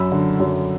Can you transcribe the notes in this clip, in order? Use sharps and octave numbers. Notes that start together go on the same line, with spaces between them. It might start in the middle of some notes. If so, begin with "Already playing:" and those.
Already playing: F#2 B5 E6
D3
F#2